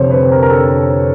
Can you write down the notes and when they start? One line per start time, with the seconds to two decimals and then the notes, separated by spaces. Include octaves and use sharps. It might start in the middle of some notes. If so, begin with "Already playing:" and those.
Already playing: F1 F2 D3 C5 C#5
0.11 B4
0.32 A#4
0.42 A#4
0.50 A4